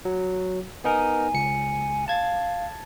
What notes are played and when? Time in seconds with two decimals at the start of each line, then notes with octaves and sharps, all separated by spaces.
0.05 F#3
0.84 B3 D#4 A#4 G#5
1.34 C#2 C#7
2.08 F5 A5 G#6 A6